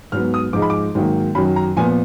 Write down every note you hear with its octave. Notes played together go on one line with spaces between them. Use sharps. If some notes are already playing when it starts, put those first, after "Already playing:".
G#2 F#3 B3 F6
D#6
G#2 F3 G#3 D#4 D6
B5
D6
G#2 D#3 F#3 A#3
F#2 D#3 F#3 B5
A#5
A#2 F3 B3 G#5